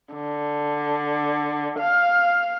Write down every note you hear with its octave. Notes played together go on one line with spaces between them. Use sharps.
D3
F5